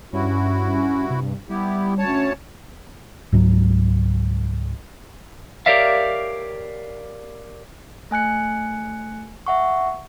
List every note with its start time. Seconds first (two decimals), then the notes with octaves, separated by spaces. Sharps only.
0.13 G2 C#4 E4 F#4
1.10 C3
1.49 G3 B3 E4 G4
1.98 D2 C#4 C#5 A5
3.32 C#2 G#2 F#3
5.66 G4 A#4 C#5 D5 E5 F5
8.11 A3 G#5 F#6 C#7
9.46 E5 F#5 C#6